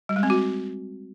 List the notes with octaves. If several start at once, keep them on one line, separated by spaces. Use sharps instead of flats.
G3
G#3
C4
F#4